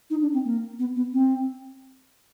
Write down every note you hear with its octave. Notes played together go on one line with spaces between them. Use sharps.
D#4
D4
C4
A#3
B3
B3
C4